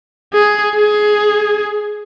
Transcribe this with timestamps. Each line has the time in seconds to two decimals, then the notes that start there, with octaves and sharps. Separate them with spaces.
0.34 G#4
0.76 G#4